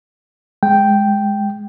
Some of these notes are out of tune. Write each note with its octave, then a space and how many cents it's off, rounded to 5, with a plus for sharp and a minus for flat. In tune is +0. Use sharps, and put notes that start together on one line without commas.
G#3 +0 G5 +0